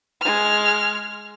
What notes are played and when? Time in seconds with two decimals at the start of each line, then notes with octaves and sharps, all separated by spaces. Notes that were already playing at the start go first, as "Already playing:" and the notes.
0.21 G#3 F6